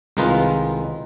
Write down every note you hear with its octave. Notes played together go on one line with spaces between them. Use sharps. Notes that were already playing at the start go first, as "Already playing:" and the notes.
C2 D#3 G#3 D#4 F4 B4